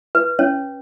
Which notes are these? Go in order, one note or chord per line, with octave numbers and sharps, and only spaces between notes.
B4
C#4 C#5